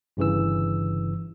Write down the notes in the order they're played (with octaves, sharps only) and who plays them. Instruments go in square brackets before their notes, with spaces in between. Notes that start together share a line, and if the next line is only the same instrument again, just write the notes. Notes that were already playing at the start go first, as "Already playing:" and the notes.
[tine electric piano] G1 G2 C#3 E3 E6